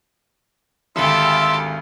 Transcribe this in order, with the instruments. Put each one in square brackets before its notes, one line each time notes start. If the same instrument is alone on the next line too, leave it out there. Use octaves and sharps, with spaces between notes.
[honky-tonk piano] G#1 D2 [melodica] F4 E5 E6 [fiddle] G4 A4